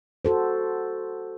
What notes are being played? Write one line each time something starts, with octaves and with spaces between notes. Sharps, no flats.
F#4 A4 C5